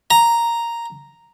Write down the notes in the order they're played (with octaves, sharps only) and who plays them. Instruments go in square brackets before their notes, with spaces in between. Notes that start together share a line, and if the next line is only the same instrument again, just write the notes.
[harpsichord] A#5